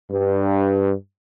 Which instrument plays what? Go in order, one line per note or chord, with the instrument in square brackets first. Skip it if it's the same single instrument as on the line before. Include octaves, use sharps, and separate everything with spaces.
[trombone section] G2